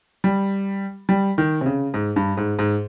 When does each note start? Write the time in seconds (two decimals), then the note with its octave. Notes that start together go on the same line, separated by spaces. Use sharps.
0.24 G3
1.09 G3
1.38 D#3
1.61 C3
1.66 C#3
1.94 G#2
2.16 G2
2.37 G#2
2.59 G#2